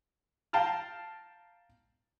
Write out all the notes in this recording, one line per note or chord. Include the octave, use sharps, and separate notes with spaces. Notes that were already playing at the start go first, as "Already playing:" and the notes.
F5 G5 A5 A#5 F6